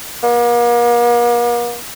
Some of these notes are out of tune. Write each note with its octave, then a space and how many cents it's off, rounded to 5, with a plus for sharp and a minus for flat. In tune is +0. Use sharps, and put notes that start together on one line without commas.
A#3 +40